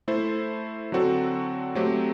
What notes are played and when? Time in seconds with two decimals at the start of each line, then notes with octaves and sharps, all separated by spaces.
0.08 A3 E4 A4 C5
0.92 D3 F#3 C4 F#4 A4
1.75 F#3 A3 C4 G4